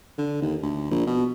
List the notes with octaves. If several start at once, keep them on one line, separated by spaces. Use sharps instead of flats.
D3
D#2
D2
A#1
B2